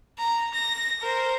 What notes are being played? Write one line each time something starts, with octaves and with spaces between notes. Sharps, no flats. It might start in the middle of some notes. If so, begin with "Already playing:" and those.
A#5
A#6
A#4 C5